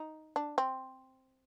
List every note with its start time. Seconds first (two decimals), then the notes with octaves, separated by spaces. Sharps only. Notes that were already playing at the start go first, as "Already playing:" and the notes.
Already playing: D#4
0.36 D4
0.58 C4